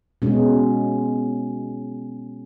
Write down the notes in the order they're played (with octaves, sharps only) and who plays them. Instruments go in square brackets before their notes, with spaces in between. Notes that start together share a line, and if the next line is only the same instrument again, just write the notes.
[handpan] B2 G#3 C#4